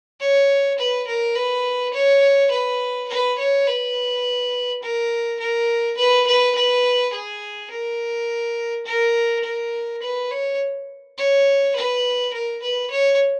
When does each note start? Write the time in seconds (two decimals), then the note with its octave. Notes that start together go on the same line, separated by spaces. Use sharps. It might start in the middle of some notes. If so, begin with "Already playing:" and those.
0.20 C#5
0.79 B4
1.07 A#4
1.35 B4
1.94 C#5
2.51 B4
3.09 B4
3.39 C#5
3.67 B4
4.83 A#4
5.40 A#4
5.97 B4
6.27 B4
6.55 B4
7.13 G#4
7.71 A#4
8.86 A#4
9.44 A#4
10.02 B4
10.31 C#5
11.18 C#5
11.76 B4
12.34 A#4
12.62 B4
12.91 C#5